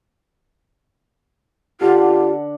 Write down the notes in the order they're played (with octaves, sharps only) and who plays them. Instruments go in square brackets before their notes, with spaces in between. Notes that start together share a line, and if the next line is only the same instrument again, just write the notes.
[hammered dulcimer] D3 D4 F#5 [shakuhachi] F4 [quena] G4